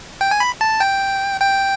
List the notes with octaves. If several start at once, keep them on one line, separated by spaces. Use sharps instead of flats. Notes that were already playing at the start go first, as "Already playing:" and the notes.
G5
G#5
B5
A5
G5
G5